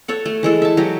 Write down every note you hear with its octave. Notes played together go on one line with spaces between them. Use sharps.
A4 C#5 F#5
A3
E3 G#3 A4
E5 A5
F#3 F#4 G4